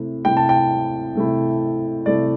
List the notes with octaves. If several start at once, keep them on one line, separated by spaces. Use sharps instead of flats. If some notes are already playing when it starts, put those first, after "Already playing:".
Already playing: C3 A3 E4
C3 A3 E4 G5
A5
G5
C3 A3 E4
C3 A3 E4 D5